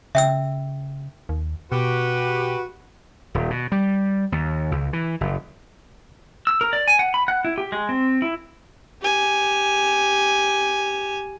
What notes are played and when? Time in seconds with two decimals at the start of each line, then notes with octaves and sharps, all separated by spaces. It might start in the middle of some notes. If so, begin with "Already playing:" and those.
0.15 C#3 E5 G5 E6
1.29 D#2
1.72 B2 F#4 G4 B4
3.35 D#1
3.50 B2
3.72 G3
4.32 D#2
4.71 C#2
4.93 E3
5.21 F#1
6.47 E6
6.61 A#4
6.73 D5
6.88 G#5
6.99 F#5
7.14 B5
7.28 F#5
7.45 E4
7.58 G4
7.72 G#3
7.89 C4
8.22 E4
9.02 G4 G#5